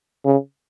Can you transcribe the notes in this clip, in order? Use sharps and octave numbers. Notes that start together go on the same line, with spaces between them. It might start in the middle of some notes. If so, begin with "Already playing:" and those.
C#3